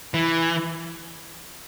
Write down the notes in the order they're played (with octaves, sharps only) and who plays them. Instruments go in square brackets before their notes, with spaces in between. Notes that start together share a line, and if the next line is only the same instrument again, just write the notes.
[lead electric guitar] E3